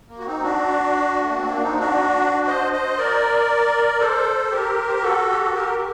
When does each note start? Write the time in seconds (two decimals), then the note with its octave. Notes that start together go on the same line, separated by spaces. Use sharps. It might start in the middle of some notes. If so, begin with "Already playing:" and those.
0.09 A#3
0.18 F#4
0.26 C4 D#4
0.42 D4 F#4
1.23 A3
1.30 A#3
1.38 C4
1.45 A#3 D4
1.61 C4 D#4
1.79 D4 F#4
2.47 C5 D#5
2.73 C5 D#5
2.98 A#4 D5
4.00 A4 C5
4.51 G4 A#4
4.88 C5
4.95 A#4
5.02 F#4 A4
5.30 G4
5.42 A4
5.53 G4 A#4